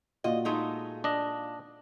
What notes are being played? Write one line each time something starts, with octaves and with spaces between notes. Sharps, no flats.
A#2 F4 F#4 D#5
G#3 A3 D#4
D4 D#5